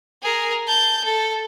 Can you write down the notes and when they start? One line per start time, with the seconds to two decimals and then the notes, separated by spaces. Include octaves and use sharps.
0.23 G#4 A#4
0.68 A5 G6
1.04 A4